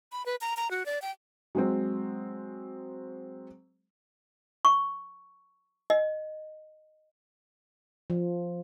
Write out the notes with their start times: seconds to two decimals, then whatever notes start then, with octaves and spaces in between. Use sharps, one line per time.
0.12 B5
0.26 B4
0.41 A#5
0.57 A#5
0.71 F#4
0.86 D5
1.02 G5
1.55 F#3 G#3 C4
4.65 C#6
5.90 D#5
8.10 F3